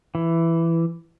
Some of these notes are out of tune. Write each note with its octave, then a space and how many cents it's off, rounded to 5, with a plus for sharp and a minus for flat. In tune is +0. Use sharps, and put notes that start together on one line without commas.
E3 +10